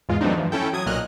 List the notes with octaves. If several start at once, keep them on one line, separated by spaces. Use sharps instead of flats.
E2 G#2 G#3 F4
E3 F#3 A3 C4 D4 D#4
G2 E3 F3
C#4 E4 A4 G5
F#3 D#6 G#6
B1 A#2 F#3 D#5 F6 F#6